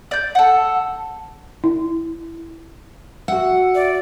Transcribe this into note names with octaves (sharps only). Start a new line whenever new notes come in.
D5 G6
A4 F#5
E4
F#4 E5 F#5
D5